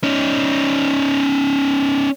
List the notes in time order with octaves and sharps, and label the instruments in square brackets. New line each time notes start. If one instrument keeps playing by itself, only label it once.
[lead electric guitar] C#4 D#4